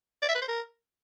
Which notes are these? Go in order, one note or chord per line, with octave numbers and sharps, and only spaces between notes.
D5
E5
B4
C5
A#4